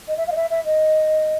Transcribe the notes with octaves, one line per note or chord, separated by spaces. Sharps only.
D#5
E5
F5
D#5
E5
E5
D#5